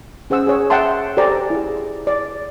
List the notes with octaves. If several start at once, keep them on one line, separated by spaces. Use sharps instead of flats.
C#4 G#4 C5 F#5 E6
G#4 C#5
E5 F#5 G5 A5 C6
G4 A4 C5 D5 G#5 A#5
E4 G#4
D5